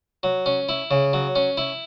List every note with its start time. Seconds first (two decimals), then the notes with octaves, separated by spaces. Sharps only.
0.23 F#3
0.46 C#4
0.69 E4
0.91 C#3
1.13 F#3
1.36 C#4
1.57 E4